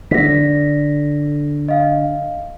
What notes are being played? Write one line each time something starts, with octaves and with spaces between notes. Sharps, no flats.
D3 A#6 B6
D#5 F5